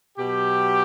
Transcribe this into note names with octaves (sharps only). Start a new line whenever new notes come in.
B2 F#3 G4